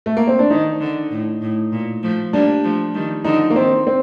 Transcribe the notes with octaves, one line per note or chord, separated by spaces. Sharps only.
A3
A#3
C4
D4
D#3 D#4
D3
A2
A2
A#2
F3 A3
G3 A#3 D4
F3 A3
D#3 G3
D3 F3 D#4
A#3
D#3 C4
C4